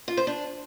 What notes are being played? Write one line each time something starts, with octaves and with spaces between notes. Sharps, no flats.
F4
C5
D4